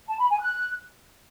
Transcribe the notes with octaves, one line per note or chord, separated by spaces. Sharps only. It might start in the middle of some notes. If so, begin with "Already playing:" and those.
A5
B5
G#5
F#6